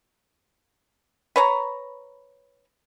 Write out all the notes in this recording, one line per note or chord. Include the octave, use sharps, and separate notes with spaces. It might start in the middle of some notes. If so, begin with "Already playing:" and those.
B4 C#5 A#5